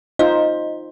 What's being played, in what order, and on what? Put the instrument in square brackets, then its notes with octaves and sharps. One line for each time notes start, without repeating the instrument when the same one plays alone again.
[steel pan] D#4 F4 C5 [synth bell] D#5